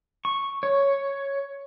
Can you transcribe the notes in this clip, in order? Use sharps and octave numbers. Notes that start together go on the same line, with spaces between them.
C#6
C#5